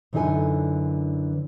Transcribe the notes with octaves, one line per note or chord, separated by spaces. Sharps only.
F#2 D3 E3 D#4 A4 G#5